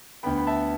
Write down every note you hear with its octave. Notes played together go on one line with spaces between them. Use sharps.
D2 D3 B3 G5 B5
B5
E5 A5